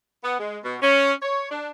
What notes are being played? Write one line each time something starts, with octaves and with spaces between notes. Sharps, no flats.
B3
G#3
B2
C#4
C#5
D4